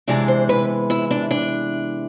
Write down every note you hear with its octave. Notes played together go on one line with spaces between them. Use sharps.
C3 E3 G#3 B3 D4 D5
C5
B4
E4
D4
D4